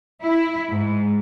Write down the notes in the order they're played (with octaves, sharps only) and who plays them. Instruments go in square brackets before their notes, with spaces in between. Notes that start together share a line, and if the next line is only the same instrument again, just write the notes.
[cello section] E4
G#2